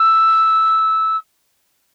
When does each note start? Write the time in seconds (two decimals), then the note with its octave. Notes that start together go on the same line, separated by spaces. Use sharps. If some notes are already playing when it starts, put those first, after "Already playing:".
Already playing: E6